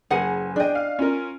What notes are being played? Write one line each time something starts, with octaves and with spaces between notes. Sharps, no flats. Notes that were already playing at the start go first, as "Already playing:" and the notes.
F#1 G#4 A#4 B4 F#5 G#5
D4 G#4 D#5 G5
F5
C#4 F4 A#4